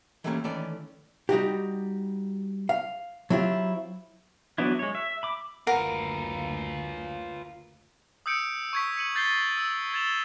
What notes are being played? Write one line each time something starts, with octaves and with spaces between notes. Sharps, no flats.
E3 G3 A3 A#3 C4 C#4
D#3 E3 A3 C#4 A4 D5
G3 D#4 F#4 G4
F5
F#3 C4 E4 F4 G4
E3 F#3 B3 D4 E4
G#3 C#5
E5
B5 D6
F#1 D2 F4 A#4 B4 F#5
D#6 E6 G6 C#7 D7
C#6 G#6 B6
C#7 D#7 F#7
G6 A6 B6 C7 G7
E6
G#6 A6 E7 F7 G7